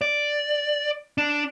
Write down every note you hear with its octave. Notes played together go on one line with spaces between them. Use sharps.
D5
D4